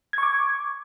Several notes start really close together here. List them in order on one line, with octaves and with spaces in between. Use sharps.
G#6 C#6 D6